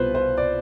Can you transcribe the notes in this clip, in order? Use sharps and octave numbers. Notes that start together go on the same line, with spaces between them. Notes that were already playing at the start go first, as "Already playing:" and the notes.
Already playing: C2 B2 F4 B4 C5
C5
D5